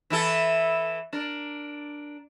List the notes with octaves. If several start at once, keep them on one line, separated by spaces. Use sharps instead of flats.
E3 E4 A4
D4 A#4